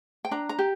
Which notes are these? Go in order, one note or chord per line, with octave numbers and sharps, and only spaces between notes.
G5
D4 A#5
A#5
G4